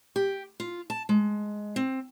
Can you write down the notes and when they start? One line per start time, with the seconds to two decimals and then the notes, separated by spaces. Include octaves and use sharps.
0.16 G4
0.60 F4
0.90 A5
1.09 G#3
1.76 C4